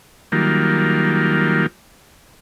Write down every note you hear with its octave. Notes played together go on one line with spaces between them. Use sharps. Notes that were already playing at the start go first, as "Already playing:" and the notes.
D#3 F#3 G3 A#3 F4